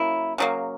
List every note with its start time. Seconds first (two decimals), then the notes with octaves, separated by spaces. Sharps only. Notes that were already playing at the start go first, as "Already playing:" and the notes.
Already playing: C#3 F#3 A#3 E4
0.38 C#3 F#3 A#3